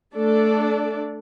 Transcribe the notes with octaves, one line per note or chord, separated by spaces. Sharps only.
A3 D4 A4 D5